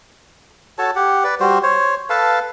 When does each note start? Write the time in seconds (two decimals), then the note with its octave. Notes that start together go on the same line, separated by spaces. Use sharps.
0.78 F#4 A4 C#5 A5
0.96 G4 F#5
1.24 B4 D5
1.40 G3 F#4 C5
1.63 C5 C#5
2.10 A4 B4 F5 A5